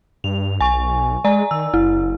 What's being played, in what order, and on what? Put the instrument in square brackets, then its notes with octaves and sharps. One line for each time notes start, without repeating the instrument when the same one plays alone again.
[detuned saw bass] G2 [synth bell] F7
[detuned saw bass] B1 [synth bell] G#5 C#6
[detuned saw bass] G#3 [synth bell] D5 G#5 A#5
[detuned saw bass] D#3 [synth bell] E6
[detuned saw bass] F#1 [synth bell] E4